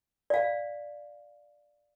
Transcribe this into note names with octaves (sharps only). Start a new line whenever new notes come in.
D5 F5